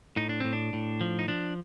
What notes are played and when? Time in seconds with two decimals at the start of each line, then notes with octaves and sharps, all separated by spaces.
0.16 A2 D#4
0.29 D4
0.40 A2 C4
0.53 D4
0.73 A2
1.01 F3
1.19 D#4
1.28 F3 D4